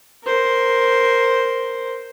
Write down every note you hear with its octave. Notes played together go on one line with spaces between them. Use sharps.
A#4 C5